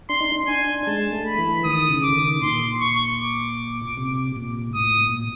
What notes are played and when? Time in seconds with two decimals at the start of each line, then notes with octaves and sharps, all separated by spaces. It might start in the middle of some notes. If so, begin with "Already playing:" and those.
0.09 D4 C6
0.20 D#4
0.32 D4
0.48 D4 G#5
0.87 G#3 A5
1.12 A3
1.26 B5
1.38 E3
1.64 D#3 D#6
1.90 C#3
2.03 D6
2.10 D3
2.16 D#3
2.42 A#2 C6
2.81 C#6
3.20 D6
3.97 C3
4.36 A#2
4.75 A2 D#6
5.01 A#2